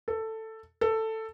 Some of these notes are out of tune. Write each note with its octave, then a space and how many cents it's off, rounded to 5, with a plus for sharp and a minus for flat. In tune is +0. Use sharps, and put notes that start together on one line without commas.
A4 +10
A4 +10